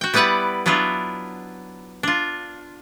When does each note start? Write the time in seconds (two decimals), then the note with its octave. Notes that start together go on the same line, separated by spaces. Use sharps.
0.01 F#4 G5
0.14 G3 B3 E4 B4 D5 F#5
0.66 F#3 B3 D4 E4 F4
2.03 D4 F4